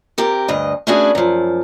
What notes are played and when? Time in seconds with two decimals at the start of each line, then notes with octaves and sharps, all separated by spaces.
0.18 C3 G4 A#4
0.48 D2 G2 D#5
0.87 A3 B3 C#4 D4 F#4 G#4
1.15 F#2 F3